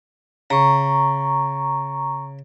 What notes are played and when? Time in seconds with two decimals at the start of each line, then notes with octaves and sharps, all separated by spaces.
0.50 C#3 A#5 C#6